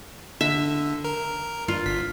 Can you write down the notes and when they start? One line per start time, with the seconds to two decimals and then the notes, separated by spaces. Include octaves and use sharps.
0.41 D3 E5
1.05 A#4
1.68 G2 F4
1.86 G1 B6